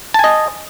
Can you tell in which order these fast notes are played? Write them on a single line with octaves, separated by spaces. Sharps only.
A5 G#5 D#5